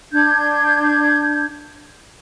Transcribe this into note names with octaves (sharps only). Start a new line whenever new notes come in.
D4 G6 G#6